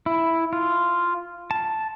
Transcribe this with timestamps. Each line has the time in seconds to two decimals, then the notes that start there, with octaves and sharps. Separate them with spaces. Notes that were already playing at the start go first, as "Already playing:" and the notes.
0.06 E4
0.53 F4
1.51 A5